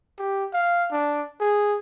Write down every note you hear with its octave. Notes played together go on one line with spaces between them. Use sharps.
G4
F5
D4
G#4